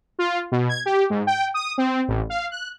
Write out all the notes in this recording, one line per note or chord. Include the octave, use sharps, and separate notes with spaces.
F4
B2
G#6
G4
G#2
G5
D#6
C4
A1
F5
F#6